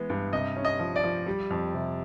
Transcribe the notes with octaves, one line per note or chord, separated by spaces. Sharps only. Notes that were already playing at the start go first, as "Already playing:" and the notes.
Already playing: E3 G#3 B3
G2
C3 D#5
C#4
D#5
F3
D5
F3
G3
F2
C3